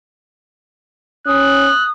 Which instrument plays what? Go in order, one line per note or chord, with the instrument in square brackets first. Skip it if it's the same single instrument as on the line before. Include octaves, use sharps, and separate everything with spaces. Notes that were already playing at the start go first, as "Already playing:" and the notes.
[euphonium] C#4 [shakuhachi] D#6 [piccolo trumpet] F#6